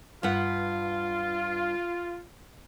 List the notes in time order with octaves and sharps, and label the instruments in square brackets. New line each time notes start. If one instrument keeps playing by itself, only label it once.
[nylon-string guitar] G2 B4 F#5 [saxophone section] F4